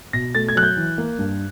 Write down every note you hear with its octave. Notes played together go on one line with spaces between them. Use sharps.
B2 A#6
A3 A6
G#6
F#3 F#6
G6
E3
A#3
G2